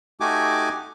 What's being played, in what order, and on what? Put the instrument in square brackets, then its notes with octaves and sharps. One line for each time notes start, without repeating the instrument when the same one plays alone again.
[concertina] A3 D#4 F#4 G4 G#5 D6